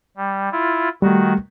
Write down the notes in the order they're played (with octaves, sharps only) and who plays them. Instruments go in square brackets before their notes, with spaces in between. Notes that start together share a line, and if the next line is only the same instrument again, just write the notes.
[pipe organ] G3
E4 F4
[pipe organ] D#3 F#4 [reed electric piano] G3 A3